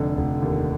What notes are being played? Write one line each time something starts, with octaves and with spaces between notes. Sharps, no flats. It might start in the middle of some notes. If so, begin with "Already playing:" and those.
Already playing: F1 D3
F1
D#2